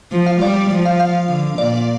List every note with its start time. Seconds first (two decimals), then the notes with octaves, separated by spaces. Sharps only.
0.12 F3
0.26 F5
0.41 G3 D5
0.71 F3
0.85 F5
1.00 F5
1.29 D3
1.58 A#2 D5